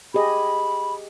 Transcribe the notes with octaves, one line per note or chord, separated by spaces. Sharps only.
G4 G#4 D#5 B5